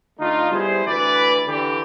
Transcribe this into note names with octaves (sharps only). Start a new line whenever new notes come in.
D3 A3 D4 D#4 F4
G3 B3 E4 G#4 C5
D2 E3 B4 D5
D3 E3 D4 G4